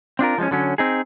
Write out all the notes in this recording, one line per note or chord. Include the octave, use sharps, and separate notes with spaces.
C4 D4 F4 A#4
F3 G#3 B3 C#4
D3 F#3 C#4
C4 D#4 G#4